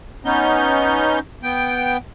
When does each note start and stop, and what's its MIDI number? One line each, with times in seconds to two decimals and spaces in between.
0.25 1.19 59
0.25 1.19 61
0.25 1.19 63
0.25 1.19 91
1.43 1.97 59
1.43 1.97 79